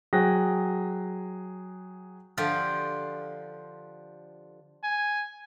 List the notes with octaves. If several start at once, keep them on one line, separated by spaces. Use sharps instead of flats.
F#3 G#4 G5 F#6 A#6
D3 F3 D4 F4 G4
G#5